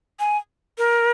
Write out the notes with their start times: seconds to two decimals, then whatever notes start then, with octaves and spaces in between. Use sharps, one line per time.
0.20 G#5
0.78 A#4